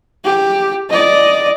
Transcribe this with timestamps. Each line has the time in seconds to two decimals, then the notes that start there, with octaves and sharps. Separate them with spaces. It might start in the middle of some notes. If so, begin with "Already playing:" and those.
0.24 G4
0.90 D5 D#5